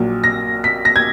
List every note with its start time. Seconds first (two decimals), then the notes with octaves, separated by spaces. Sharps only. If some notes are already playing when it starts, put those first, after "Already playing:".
Already playing: A#1 A#2 F#3
0.24 A#6
0.64 B6
0.85 A#6
0.96 G#6